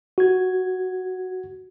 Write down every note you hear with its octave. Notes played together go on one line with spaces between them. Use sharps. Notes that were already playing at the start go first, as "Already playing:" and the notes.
F#4 G#6